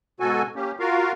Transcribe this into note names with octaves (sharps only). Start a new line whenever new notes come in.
G#2 B2 F#4 A4 G#5
A#3 C#4 G4
F4 F#4 A#4 F5